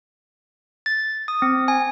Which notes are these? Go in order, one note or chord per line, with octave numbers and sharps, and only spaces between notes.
A6
D#6
C4
G#5